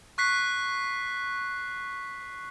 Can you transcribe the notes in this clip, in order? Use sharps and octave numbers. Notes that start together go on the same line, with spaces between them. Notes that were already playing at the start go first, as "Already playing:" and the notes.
C#6 F#6 B6 C7